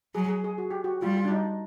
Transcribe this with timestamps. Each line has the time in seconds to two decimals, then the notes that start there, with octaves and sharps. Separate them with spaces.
0.14 F#3 G#4
0.29 G#4
0.44 G#4
0.58 F#4
0.71 G4
0.84 F#4
1.02 G3 F4
1.17 F4
1.25 D4
1.32 D#4